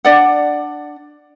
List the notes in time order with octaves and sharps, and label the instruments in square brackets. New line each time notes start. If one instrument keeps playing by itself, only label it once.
[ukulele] D4 D5 F#5